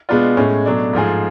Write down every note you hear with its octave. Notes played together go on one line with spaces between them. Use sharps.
B2 G#3 B3 D4 F4
A2 G#3 C#4
B2 F#3 A3 D4
G#2 F3 A3 F4 G#4